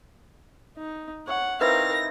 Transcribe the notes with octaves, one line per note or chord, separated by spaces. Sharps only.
D#4
C#5 F#5
C4 D#4 E4 A#4 B4 F5 A#6